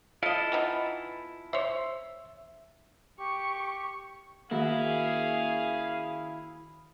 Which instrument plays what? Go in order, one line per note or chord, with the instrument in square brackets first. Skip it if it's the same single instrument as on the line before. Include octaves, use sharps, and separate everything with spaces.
[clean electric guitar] E4 F4 A4 [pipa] D#5 F5
[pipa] E3 B3 D#4
[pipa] C5 C#5 [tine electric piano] E5
[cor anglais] G4 [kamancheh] C#6
[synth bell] D#3 [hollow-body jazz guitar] A#3 F#4 E5 [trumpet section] C#4 G#4 F5 [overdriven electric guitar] E4